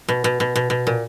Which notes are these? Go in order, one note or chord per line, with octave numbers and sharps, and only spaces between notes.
B2
B2
B2
B2
B2
A#2